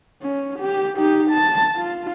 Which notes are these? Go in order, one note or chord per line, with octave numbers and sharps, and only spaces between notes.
C#4
G4
D#4 G4
A5
F4